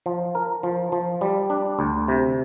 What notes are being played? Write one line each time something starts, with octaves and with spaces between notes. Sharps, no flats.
F3
A#4
F3
F3
G3
D4
D2
C3